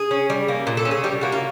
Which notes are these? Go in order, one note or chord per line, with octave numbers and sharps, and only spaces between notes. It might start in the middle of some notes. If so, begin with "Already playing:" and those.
Already playing: G#4
C#4
G3
A#3
A#2
A4
C#4
G#4
G3 G4
A#3 F#4
F4